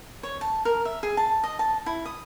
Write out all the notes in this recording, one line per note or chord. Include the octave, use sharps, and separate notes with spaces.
C#5
A5
A#4
E5
G#4
A5
D#5
A5
E4
D#6